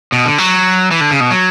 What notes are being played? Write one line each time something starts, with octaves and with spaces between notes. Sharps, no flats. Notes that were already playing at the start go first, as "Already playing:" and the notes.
B2
D3
F#3
E3
D3
C#3
B2
F#3